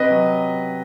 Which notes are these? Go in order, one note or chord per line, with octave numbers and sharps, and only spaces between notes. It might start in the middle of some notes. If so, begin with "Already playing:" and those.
Already playing: C3 B4 D#5
F#3